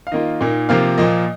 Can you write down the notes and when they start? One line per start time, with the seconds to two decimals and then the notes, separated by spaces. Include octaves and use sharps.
0.07 F5
0.12 D#3 A#3 F4 D#5
0.41 A#2 A#3 D#4
0.69 C3 F3 A#3 F4 F5
0.98 A#2 F3 A#3 D#5